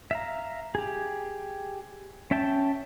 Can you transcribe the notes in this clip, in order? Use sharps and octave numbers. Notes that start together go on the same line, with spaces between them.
E5 F5 A#5
G4 G#4
C#4 E5 G5 A5